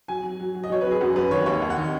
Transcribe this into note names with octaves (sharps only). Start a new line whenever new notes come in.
F#3 G#5
F#3
F#3
F#3
D#5
F#3 C#5
F#3 B4
G#4
F#2 F#4
F#2 B4
D#3 C#5
D#2 C#5
D#2
F#5
D#3